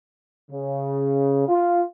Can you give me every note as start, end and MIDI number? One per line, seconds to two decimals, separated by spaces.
0.51 1.47 49
1.48 1.82 65